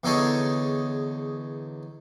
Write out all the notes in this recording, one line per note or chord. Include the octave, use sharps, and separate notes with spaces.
E2 D3 D#4 G#4 A4 C#5